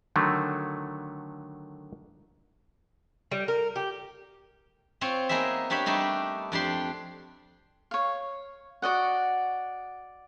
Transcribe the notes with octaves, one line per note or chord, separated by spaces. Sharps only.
D3 D#3 F#3 A3
G3
A#4
G4
C4 F4 C#5
A#3 B3 D#4 G#4 E5
D4 G4 C#5 E5 B5
G3 A3 D4 D#4
F2 D4 G4 C6
C#5 F5
F#4 D5 D#5 F#5